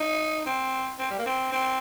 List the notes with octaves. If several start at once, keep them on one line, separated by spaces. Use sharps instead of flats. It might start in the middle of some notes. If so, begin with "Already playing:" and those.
Already playing: D#4
C4
C4
G3
A#3
C4
C4